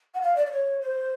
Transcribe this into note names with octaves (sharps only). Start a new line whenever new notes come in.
F#5
F5
D5
D5
C#5
C5